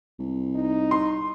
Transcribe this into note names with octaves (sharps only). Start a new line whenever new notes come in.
C2
D#4
C6